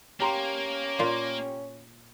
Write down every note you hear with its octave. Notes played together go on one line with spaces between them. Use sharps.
A#3 C#4 G4 A#5 C6
A#2 F4